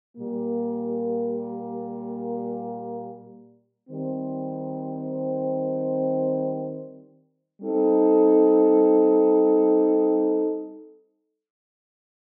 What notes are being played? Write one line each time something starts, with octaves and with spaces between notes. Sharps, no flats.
A#2 G3 A#3
D#3 G3 C4
G3 C4 D#4 A4